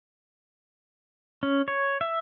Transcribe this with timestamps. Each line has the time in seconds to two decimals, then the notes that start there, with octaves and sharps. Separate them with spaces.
1.43 C#4
1.68 C#5
2.01 E5